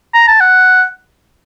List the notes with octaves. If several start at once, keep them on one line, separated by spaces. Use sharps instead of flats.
A#5
A5
F#5